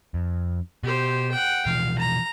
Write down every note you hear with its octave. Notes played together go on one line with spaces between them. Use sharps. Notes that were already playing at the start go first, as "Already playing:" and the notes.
F2
B2 G4 C5
F#5 G5
B2 E3 F3 F5
A#5